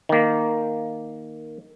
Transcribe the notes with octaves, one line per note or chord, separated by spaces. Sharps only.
D#3 A#3